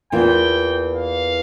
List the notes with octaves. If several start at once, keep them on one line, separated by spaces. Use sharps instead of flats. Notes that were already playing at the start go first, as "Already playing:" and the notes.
E2 E3 A#3 F4 G5
F5